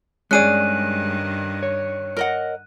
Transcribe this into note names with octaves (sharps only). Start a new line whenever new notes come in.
G2 D#3 G#3 C#4 G#4 D5 F#6 D#7
C#5
A#4 D#5 F#5